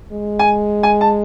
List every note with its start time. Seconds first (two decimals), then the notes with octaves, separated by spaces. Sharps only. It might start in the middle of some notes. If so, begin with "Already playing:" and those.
0.12 G#3
0.39 G#5
0.83 G#5
1.01 A5